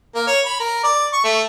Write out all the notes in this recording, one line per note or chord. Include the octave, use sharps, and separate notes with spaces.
A#3
C#5
B5
A#4
D5
C#6
A3